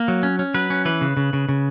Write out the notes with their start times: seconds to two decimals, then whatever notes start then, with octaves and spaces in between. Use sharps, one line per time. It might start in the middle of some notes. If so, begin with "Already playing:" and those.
Already playing: A#3
0.08 F#3
0.23 C#4
0.39 C#4
0.54 F#3 B4
0.70 C#4
0.85 E3 B4
1.01 C#3
1.17 C#3
1.33 C#3
1.49 C#3